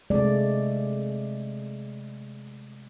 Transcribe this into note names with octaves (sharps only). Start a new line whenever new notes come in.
C3 G#3 A3 D5